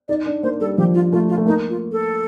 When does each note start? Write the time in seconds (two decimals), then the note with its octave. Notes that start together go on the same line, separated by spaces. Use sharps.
0.08 D#4 D5
0.26 D4
0.43 A#3 C5
0.60 G3 A4
0.77 F3 G4
0.94 F4
1.12 A3 F4
1.29 F4
1.37 A3
1.46 A#3 D#4
1.69 F4
1.92 A4